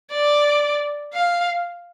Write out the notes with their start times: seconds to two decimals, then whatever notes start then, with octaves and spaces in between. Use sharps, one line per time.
0.11 D5
1.14 F5